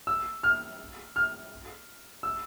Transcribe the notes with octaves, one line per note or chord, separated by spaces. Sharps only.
E6
F6
F6
E6